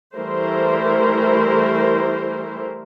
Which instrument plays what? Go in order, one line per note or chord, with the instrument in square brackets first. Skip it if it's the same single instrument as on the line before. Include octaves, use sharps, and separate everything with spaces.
[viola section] E3 G3 A3 E4 A#4 C5